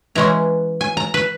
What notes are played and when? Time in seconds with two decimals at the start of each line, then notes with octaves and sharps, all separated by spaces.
0.15 E3 G#3 C#4 A#5
0.81 G#5
0.97 A#5
1.14 B4